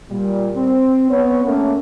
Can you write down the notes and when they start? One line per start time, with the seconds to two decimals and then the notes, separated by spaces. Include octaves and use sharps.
0.11 A#2 G3
0.57 C4
1.10 B3 C#5
1.44 A3 A#3 C#4